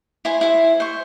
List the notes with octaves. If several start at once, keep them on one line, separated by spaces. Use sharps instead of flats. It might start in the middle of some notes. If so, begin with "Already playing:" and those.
E4 C5 G#5
E4 C5 E5
C5 C#6